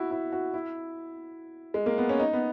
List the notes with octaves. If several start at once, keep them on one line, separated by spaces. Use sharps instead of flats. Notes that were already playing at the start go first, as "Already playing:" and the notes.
Already playing: E4 F#4
E4
F#4
E4
G#3
A#3
B3
C#4
D#4
B3